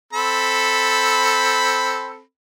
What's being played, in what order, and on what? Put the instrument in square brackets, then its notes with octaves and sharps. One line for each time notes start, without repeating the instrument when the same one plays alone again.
[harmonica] C4 A4 B5